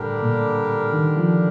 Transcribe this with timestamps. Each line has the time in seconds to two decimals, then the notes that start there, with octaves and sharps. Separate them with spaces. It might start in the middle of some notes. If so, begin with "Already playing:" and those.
Already playing: A2 D3 G3 D4 G4 A#4
0.22 A#2
0.93 D#3
1.16 F3